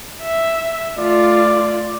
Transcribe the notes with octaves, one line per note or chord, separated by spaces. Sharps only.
E5
A3 F4 D5